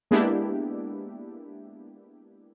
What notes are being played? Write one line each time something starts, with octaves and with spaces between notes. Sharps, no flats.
G#3 A#3 B3 D4 E4 G4